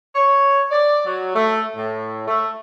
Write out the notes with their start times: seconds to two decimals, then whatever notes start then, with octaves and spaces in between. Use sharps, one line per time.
0.16 C#5
0.71 D5
1.06 F#3
1.36 A3
1.77 A2
2.28 A3